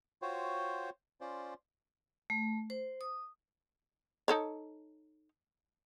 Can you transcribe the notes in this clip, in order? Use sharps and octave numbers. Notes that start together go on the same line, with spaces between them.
F4 F#4 C5 C#5 G5
C#4 F4 C5 D5
A3
C5
D#6
D#4 A4 C#5